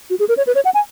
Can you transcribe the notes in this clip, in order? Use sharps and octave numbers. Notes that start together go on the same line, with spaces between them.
F#4
G#4
A#4
C#5
B4
C#5
F#5
G#5